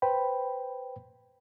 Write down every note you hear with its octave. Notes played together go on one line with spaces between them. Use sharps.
B4 C5 G5 B5